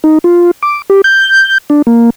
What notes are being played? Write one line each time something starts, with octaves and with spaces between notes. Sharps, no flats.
D#4
F4
D6
G4
G6
D4
A#3